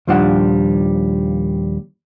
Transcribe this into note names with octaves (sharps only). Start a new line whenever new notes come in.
D#2 A#2 F3 G3 D4 F#5